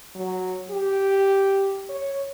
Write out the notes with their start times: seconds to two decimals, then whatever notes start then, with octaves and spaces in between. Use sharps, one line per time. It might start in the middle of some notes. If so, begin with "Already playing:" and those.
0.15 F#3
0.71 G4
1.89 C#5